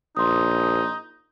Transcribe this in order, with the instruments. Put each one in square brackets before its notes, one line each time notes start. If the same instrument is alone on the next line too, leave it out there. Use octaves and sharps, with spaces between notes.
[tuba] A#1 [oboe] D#4 [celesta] C6 D#6